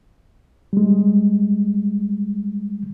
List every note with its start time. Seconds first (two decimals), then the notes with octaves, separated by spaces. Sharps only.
0.73 G3 G#3